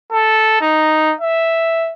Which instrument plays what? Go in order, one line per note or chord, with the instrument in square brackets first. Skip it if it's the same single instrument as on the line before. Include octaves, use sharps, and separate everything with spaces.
[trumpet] A4
D#4
E5